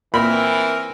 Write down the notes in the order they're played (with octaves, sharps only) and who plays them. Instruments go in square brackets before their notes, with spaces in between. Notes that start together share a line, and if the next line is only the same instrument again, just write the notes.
[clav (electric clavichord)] A#2 [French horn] E3 [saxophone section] C4 A#4 [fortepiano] B5